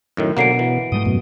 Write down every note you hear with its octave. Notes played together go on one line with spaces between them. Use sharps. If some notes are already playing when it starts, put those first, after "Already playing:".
F#2 A2 D#3
B2 D3 F#3 A#3 F#5 C7 D7
E3
G#2 G3 A3 D#6
F#2 B2